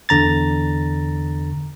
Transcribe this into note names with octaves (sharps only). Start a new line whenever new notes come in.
E2 D3 A#5 A6